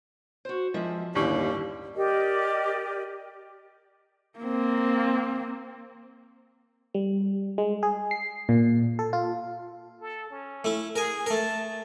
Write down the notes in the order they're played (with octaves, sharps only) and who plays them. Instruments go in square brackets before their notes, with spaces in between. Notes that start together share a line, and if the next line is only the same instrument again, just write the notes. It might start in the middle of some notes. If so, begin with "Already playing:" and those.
[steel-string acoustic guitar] F#4 C5
[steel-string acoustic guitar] E2 G#3 E5 [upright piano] F3
[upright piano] G1 A2 C#6 [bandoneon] D#2 [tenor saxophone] G3 [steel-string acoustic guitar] C#4
[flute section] G4 A#4 D5 D#5
[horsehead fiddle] A#3 C4
[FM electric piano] G3
G#3
G#4
C7
A#2
A4
F4
[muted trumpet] A4
C#4
[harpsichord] A3 E4
[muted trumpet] G#4 [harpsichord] A#4 G#5
[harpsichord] A3 A#4 [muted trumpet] A5